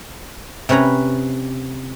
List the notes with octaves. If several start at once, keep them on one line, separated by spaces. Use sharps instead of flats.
C3 C#4 B4 C#5 A#5